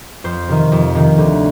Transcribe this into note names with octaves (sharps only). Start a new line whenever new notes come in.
F2 C5
C3 D#3
F2
C3 D#3
D2